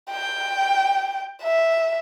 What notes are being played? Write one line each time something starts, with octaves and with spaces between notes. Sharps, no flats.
G5
E5